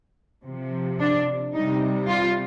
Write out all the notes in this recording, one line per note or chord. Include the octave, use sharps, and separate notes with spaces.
C3 F3
D4
C3 G3 D#4
F4